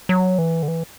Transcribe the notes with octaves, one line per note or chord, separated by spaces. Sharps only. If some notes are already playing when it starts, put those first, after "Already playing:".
F#3
E3
D3
E3